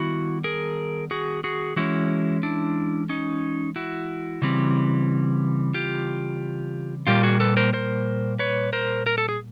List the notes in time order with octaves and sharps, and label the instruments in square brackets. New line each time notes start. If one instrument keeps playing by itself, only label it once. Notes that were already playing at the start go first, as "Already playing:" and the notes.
Already playing: [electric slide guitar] D#3 G3 B3 E4 F#4
G#4 A#4
F#4 G#4
F#4 G#4
E3 G#3 C#4 E4 F#4
D4 E4
C#4 D#4
E4 F#4
C#3 E3 G3 C4
F4 G4
A#2 G3 A#3 F4 G4
F#4 G#4
A4 B4
A#4 C5
A#4 C5
B4 C#5
A#4 C5
A#4
A4
G#4